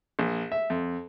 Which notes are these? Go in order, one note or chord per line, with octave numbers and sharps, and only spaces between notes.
A#1
E5
F2